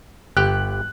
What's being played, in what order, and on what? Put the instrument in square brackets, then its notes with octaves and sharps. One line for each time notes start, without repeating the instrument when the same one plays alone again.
[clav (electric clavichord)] G1 G4 G5 [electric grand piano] F#6